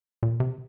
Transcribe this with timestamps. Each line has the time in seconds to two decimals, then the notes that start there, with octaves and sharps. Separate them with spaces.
0.23 A#2
0.40 C3